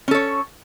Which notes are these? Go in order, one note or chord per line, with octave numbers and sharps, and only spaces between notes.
C#4 A4 C#5